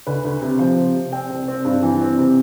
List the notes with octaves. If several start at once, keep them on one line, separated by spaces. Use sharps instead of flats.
D2 B4
D2
C3
F3 C5
C3
C3
C4 G5
C2
C4
G2
E3
C4
C3